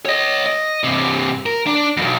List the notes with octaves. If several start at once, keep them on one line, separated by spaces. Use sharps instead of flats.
C#5 D#5
D#5
G2 C3
A#4
D4
B1 F2